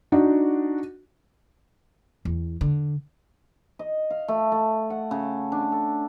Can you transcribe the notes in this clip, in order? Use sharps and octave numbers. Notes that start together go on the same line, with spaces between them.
D4 D#4 F#4
E2
D3
D#5
F5
A3
A3
F#5
C#3
D4
A4